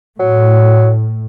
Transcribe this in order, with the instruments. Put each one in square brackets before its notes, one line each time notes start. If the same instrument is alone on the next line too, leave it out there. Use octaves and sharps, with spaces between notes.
[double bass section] A2 [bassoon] F#3